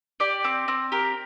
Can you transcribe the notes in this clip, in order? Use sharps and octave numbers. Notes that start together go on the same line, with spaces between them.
G4 D5
C4
C4
G4 A#4